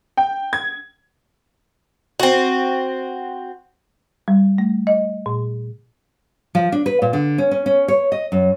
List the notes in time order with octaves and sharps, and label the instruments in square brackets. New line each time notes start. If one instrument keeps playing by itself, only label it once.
[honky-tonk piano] G5
G#6
[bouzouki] C4 F#4
[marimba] G3
A3
D#5
A#2
[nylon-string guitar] F3
D4
B4
A#2
D3
C#4
C#4
C#4
C#5
D#5
F#2